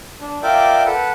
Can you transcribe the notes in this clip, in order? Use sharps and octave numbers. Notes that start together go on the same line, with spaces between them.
D4
F4 A#4 D5 E5 G5 D6
A4 B4 F#5